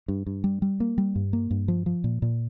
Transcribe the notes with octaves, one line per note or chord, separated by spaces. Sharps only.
G2
G2
G3
G3
A#3
G3
G2
A#3
G2
F3
F3
A#2
A#2